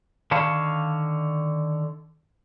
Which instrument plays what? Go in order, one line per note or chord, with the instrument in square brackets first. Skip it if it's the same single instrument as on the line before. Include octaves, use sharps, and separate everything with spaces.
[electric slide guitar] D3 D#3 C#5 F5 A5